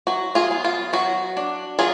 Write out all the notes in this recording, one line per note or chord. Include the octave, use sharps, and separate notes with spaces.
F#3 F#4
F4 G#4
B3
F4
F#3 F#4
D4
F#3 F4 G#4